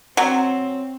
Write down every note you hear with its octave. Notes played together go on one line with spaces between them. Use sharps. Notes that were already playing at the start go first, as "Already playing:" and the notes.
F#3 C4